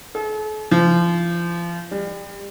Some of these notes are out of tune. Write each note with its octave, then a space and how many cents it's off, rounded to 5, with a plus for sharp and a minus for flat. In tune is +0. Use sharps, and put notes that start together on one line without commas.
A4 -45
F3 -30
G3 +30